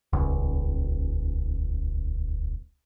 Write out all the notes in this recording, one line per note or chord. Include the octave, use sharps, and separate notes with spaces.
D#1 C#2